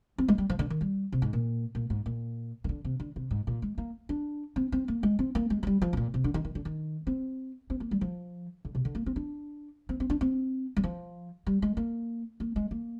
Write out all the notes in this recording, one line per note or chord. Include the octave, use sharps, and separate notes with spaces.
C4
G#3
G3
F3
D3
D#3
G3
C3
G#2
A#2
A#2
G#2
A#2
D#3
D3
C3
D3
C3
G#2
A#2
G#3
A#3
D4
C4
C4
A#3
G#3
C4
A#3
G#3
F3
G3
F3
C3
A#2
C3
D3
D#3
D#3
D3
D#3
C4
C4
A#3
G3
F3
D3
C3
D3
A#3
C4
D4
C4
C4
D4
C4
G3
F3
G3
G#3
A#3
A#3
G#3
A#3